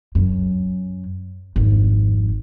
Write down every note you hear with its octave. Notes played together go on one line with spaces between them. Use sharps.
F#2
G#1 F2